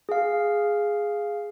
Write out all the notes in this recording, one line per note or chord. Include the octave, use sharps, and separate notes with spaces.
G#4 F5